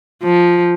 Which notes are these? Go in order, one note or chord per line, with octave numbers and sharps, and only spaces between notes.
F3